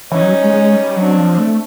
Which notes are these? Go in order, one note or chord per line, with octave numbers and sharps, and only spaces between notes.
E3 C#4 D#4
F#3
G3
G#3
G#3
G3
F#3 C4 D4
F3
A3